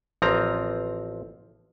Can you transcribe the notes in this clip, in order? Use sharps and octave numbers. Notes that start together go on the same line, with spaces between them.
A1 F3 C4 A#5